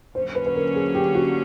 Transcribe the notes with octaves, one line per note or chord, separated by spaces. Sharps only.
D3 F#3 A#3 C#4 C5
B4
B4
A#4
G#4
G4
F#4